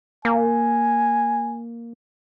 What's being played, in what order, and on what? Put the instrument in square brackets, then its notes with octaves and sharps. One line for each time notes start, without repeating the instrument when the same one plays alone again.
[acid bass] A#3 [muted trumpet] G#5